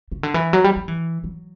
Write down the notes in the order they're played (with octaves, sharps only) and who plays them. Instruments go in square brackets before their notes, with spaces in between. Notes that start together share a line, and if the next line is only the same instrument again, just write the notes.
[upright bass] C#3
D3
E3
F#3
G3
F#3
E3
F#3